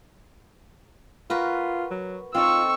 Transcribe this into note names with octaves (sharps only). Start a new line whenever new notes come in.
F4 F#4 A#4 B4
F#3
C4 D#4 F4 A4 C#6 E6